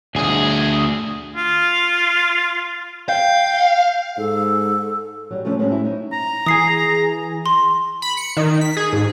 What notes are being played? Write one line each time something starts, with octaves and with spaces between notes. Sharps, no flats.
D2 G#4
F4
F5 G5
G#2 A4
F#3 G3
C#3 F3 F#3 A3 C#4 D4
A2 F#3 G#3 C4 C#4
E4
D#4
A#5
E3 G#4 D#6 C7
C6
B5
C#7
D#3
B6
G#4
G#2